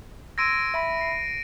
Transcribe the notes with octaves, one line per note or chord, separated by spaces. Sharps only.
C6 E6 G#6 A#6 D7 D#7
E5 B5 B6
C7